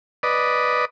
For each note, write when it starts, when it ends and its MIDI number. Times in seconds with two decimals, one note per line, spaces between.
0.23 0.85 71
0.23 0.85 74
0.23 0.85 75